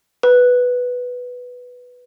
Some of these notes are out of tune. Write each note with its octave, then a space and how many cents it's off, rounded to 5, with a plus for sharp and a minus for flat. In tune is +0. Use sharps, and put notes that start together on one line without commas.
B4 +0